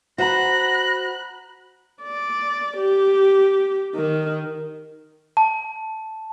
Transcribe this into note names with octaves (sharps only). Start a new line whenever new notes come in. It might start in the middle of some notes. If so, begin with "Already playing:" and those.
F#4 C5 F#5 A#5 B5 F#6 A#6
D5
G4
D#3
A5